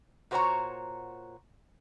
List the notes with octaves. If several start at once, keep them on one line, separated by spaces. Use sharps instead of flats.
A#2 F#4 C5 C#5 F#5 A#5